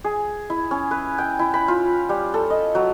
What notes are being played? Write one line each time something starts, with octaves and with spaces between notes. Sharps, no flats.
G#4
E4
C#4
B4
G5
E4
B5
F4
G3
A4
D#5
F#3